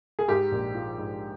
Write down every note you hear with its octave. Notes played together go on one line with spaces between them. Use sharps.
G#4
G#2 G4
A#1
F3
G#2